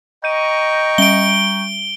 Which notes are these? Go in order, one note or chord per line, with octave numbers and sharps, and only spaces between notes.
D#5 G5 A#5 C#6 G6 D#7
G3 D7 G7